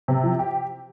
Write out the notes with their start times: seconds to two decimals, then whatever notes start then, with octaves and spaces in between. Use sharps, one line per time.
0.08 C3
0.23 F3
0.39 G4